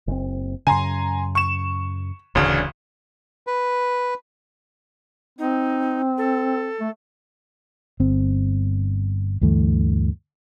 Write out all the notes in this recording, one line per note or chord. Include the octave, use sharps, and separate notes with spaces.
F#1 C4
F#2 C#3 G#5 A#5 C6
C#6 E7
D1 A1 D2 C#3 C#4 D4
B4
C4 D#4
A4
A3
G1 C4
D2 G2 E3 A3